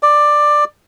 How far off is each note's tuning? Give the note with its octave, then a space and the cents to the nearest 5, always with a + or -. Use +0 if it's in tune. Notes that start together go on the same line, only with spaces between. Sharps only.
D5 +10